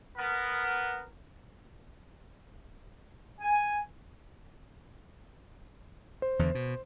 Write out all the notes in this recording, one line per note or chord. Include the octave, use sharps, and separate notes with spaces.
B3 A#4
G#5
C5
E2 D3
B2